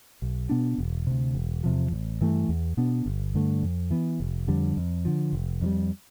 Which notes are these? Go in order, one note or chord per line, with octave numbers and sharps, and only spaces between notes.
B1
B2 B3 D4
E1
D2 C3
E1
E2 C3 F3
A1
G2 E3 A3
E2
B2 B3 D4
G1
G2 D3 A3
F2
E3 B3
F1
F2 D3 G3
F2
D3 F3
F1
F2 E3 G3